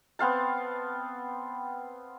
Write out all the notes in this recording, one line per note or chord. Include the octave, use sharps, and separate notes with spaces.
B3 C4 F5 A5